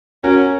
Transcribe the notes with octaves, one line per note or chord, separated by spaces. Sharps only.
C#4 F#4 A#4